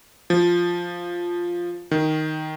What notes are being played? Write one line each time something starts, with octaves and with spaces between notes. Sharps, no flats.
F3
D#3